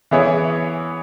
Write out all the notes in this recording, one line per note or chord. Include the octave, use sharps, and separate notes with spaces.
E3 B3 E4 G#4 C#5